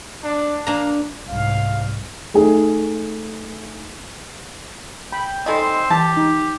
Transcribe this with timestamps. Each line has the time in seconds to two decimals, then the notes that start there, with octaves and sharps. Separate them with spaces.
0.24 D4
0.67 A#3 D4 A#5
1.28 C2 G#2 F5
2.34 A3 D#4 G#4
5.13 G5 B5
5.46 D#3 G3 G#3 C4 A4 D#5
5.90 E3 G4 A5
6.17 D#4